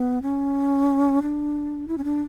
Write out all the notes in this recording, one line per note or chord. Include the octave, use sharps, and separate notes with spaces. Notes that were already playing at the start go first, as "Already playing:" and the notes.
Already playing: B3
C#4
D4
E4
C#4
D4